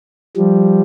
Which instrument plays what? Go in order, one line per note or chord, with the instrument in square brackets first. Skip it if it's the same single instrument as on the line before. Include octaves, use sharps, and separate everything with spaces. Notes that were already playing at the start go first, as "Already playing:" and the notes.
[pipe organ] F3 G3